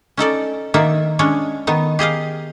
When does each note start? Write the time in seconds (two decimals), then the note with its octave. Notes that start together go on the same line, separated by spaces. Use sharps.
0.17 C#4 D#4 A4 D5
0.74 D#3 A#3 D#4 D5 E5
1.19 G#3 C#4 D4 C#5
1.67 D#3 B3 D#4
1.99 G4 G#4 D#5 F5